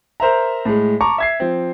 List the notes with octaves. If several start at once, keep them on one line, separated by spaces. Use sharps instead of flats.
A#4 C5 E5 A#5
A2 G#3
A5 A#5 C#6 D6
E5 G#6 C7
F3 C4